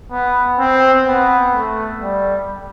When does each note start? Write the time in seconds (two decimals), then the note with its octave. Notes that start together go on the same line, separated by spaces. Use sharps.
0.11 B3
0.59 C4
1.07 B3
1.54 A3
2.01 G3